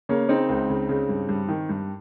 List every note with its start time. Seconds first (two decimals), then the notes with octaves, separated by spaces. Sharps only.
0.09 C#3 A#3 C#4
0.29 C#3 C4 D#4
0.49 C#2
0.70 C#3
0.89 C#3
1.09 G2
1.29 G2
1.49 D#3
1.69 G2